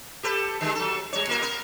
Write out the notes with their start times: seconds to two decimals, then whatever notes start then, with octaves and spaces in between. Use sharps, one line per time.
0.23 G4 A4 B4
0.61 D3 F#3 G#3
0.75 F#3 A4
1.13 G3 C#5
1.27 A#2 A#3 A#4
1.42 B3 A#4